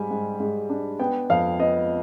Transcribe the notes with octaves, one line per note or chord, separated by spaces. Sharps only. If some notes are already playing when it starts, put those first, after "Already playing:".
Already playing: G#2 G3 G#5
G#2
G#2
D4
B3 G5
F2 F5
B3 D#5